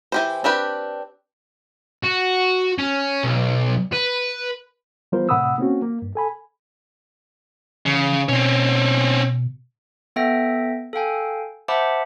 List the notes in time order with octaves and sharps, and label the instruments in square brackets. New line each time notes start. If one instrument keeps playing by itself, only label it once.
[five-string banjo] E3 G4 C5
C4 D4 G4 B4
[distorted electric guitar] F#4
C#4
B1
B4
[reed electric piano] E3 G3 B3 F4 A#4 C5
A2 C3 F#5 B5 D#6 E6
A#3 C4 C#4 F#4
A#3
G2
A4 G#5 B5
[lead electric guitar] C#3 [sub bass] E3
[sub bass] B2 [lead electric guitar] C4 C#4
[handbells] B3 A4 E5 G5 A#6
A4 F5 G5 G#5
C5 E5 F#5 A5 B5 D6